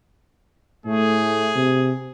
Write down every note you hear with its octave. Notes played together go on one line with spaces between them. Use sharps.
A2 A3 G#4
C3